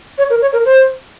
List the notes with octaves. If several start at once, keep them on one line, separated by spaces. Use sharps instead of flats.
C#5
A#4
C#5
A#4
C5